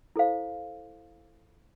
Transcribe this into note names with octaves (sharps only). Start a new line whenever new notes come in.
E4 A4 C5 F5